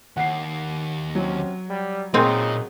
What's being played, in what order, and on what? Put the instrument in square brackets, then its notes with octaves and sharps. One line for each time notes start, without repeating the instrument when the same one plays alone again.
[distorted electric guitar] D#2 [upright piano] F#5 C7
[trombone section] C3 C#4 [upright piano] F#3
[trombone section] G3
[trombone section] F#2 C#3 D#4 [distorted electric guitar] A#2 [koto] G#3 C4